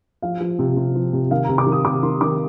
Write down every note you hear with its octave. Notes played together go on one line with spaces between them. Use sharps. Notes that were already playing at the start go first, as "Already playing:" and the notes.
F3 F5
F3
C3
C3
F3
C3
D#3 F5
C3 A#5
D6
D#3
D#6
C3 D6
D#3 C6
D#3 D6